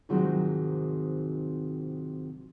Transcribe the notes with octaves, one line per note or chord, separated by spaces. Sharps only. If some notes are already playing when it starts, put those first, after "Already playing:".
G#2 C3 D#3 F3 F#3 G#3